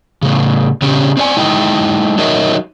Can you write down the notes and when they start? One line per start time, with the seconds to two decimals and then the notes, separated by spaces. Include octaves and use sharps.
0.22 A2 C#3
0.82 C#3 C#4 D4 G4
1.17 C4 D4 D5 G#5
1.37 G#3 D#4 E4 D#5 G5
2.18 F#3 D#4 A#4 C#5 D#5 E5